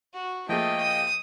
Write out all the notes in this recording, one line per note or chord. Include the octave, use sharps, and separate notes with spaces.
F#4
F3 A3 A#3 G#4 D#5 G5
D#6